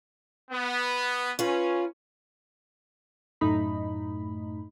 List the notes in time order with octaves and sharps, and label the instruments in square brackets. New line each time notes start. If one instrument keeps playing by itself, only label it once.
[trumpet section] B3
[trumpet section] C#4 [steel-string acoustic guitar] F4 B4
[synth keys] F#2 A2 A3 D#4 B5